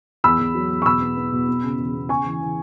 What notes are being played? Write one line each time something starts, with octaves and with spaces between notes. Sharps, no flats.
E2 B5 E6
E2
F#3
E2
C#6
B2 B5 E6
B3
B3
B2
B3
C#3
E2
B3
C#3 G#5 C#6
E3
E3